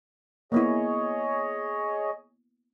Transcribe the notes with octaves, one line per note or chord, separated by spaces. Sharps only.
A#3 B3 E4 G#4 C#5 D#5